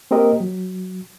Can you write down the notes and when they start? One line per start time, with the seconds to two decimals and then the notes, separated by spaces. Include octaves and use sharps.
0.11 A#3 C4 G4 A#4 D#5
0.40 F#3